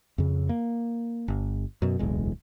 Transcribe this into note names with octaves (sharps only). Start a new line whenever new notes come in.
F2 C#3
A#3
G1
F#2 B2
D1 B1 E2 G#3